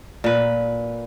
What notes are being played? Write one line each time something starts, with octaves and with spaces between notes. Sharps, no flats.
A#2 B4